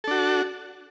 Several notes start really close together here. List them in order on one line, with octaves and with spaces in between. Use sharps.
A4 D4 F#4